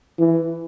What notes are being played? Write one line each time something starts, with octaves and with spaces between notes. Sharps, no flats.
E3